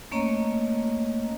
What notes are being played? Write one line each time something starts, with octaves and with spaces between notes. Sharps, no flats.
A3 A#3 C#4 C#5 D#5 A#5